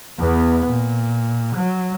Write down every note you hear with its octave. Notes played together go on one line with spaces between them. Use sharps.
E2 B3
A#2
F#3